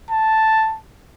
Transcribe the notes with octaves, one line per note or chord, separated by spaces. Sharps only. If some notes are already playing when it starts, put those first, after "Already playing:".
A5